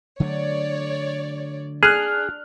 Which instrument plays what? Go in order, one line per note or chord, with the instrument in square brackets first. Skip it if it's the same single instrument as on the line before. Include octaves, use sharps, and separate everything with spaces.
[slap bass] D3 F#3 A3 [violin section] C#5 D5
[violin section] D4 [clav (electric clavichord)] G#4 [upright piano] F6 F#6